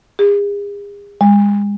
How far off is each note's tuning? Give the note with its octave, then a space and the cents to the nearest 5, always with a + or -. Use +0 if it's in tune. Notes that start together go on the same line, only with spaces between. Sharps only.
G#4 -40
G#3 -35